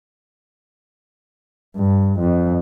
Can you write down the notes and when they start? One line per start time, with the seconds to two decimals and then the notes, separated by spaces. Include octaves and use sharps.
1.77 G2
2.19 F2